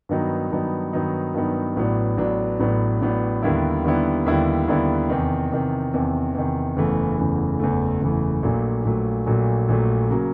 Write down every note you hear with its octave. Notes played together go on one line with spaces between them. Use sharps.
G2 D#3 F#3 B3 D#4
G2 D#3 F#3 B3 D#4
G2 D#3 F#3 B3 D#4
G2 D#3 F#3 B3 D#4
A1 A2 F#3 B3 D4
A1 A2 F#3 B3 D4
A1 A2 F#3 B3 D4
A1 A2 F#3 B3 D4
D#2 D3 G3 B3 E4
D#2 D3 G3 B3 E4
D#2 D3 G3 B3 E4
D#2 D3 G3 B3 E4
E2 C3 D#3
E2 C3 D#3
E2 C3 D#3
E2 C3 D#3
F#1 E2 C#3 E3 A3
F#1 E2 C#3 E3 A3
F#1 E2 C#3 E3 A3
F#1 E2 C#3 E3 A3
A#1 A#2 F#3 A3
A#1 A#2 F#3 A3
A#1 A#2 F#3 A3
A#1 A#2 F#3 A3
C#3 F#3 A#3